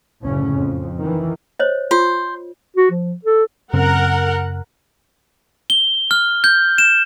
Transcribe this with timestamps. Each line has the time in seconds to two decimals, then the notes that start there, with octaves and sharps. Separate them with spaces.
0.23 F#1 D2 A2 C#3 C#4
0.52 F2
0.98 D#3 E3
1.60 C5 C#5 D#5
1.91 F4 C5
2.76 F#4
2.91 F3
3.25 A4
3.73 F#2 C#3 C4 A#4 F#5
5.70 G7
6.11 F6
6.44 G6
6.78 E7